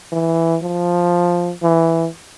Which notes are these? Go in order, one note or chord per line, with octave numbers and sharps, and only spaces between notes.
E3
F3
E3